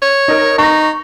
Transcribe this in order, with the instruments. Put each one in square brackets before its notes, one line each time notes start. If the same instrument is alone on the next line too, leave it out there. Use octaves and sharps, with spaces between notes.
[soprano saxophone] C#5
[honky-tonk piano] D#4 A#4
[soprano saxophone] D#4 [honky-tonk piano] C#6 A#6